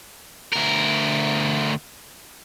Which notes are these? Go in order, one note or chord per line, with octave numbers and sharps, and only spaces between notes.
D2 A#4